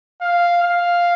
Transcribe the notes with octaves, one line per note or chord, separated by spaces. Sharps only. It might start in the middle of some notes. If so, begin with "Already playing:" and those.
F5
F5